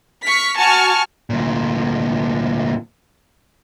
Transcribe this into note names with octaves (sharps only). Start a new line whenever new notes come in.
C#6 F6 B6
F#4 G#5 A5 C#6 F6
D2 A#2